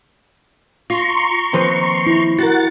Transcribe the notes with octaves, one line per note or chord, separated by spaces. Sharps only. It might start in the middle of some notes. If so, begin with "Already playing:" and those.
F4 A#5 C6 C#6
D#2 F3 C4 B4
E4
F#4 G4 A#4 F#5 A6